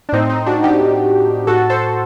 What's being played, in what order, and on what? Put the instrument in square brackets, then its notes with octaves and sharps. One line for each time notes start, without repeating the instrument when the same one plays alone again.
[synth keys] D4
A2 C4 D#4
C4 D#4
D4 F#4
D#4 G4
A2
A2 F#4 A4
A4 C5